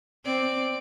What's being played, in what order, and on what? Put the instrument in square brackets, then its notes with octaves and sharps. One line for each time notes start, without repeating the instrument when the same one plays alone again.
[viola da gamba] C4 [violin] D5